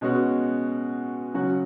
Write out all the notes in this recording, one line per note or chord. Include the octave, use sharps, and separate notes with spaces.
B2 G#3 C#4 F#4
C#3 F#3 C#4 F#4